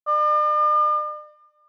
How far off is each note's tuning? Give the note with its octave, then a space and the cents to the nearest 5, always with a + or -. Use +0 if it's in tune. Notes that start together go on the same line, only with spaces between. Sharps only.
D5 +45